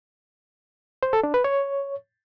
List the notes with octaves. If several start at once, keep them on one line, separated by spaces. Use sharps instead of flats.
C5
A4
D4
B4
C#5